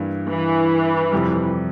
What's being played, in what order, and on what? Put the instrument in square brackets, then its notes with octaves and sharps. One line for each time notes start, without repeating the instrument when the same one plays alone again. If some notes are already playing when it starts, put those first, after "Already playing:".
Already playing: [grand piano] G2 E3 A#3
[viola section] E3
[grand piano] F2 C3 G3